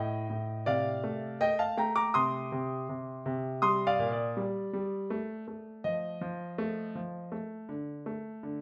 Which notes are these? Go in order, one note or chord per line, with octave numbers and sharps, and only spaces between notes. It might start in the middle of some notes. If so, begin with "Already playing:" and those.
Already playing: A2 D#5 G5
A2
C3 D5 F5
A3
A3 D#5 G5
F5 A5
A3 G5 A#5
A#5 D6
C3 C6 D#6
C3
C3
C3
G3 C6 D#6
D5 F5
A#2
D5
G3
G3
A3
A3
F3 D#5
F3
A3
F3
A3
D3
A3
D3